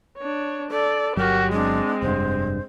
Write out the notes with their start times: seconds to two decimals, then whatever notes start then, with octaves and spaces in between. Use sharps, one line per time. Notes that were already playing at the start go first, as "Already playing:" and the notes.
0.19 D4 C#5
0.71 A4 D5
1.17 G1 F#3 F#4 G4 A#4
1.53 G#3 C4 D4
2.02 F1 G2 C5